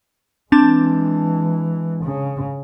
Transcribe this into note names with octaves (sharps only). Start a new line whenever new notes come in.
E3 G#3 C4 D4 A5
C#3